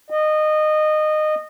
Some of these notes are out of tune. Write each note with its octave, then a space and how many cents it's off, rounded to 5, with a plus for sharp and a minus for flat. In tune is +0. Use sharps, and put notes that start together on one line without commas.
D#5 -20